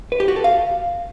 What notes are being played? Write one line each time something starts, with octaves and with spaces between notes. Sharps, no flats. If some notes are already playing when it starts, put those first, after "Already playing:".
B4
G4
F#4
A4
F5